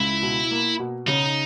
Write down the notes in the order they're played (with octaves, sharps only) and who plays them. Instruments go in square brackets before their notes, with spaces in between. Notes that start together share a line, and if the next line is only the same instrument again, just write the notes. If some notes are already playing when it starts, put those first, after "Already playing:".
Already playing: [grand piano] C#2 [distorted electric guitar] E4
[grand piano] B2
A#3
B2
[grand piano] C#3 [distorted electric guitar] D#4